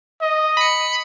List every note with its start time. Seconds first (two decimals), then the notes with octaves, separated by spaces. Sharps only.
0.22 D#5
0.57 B5 C#7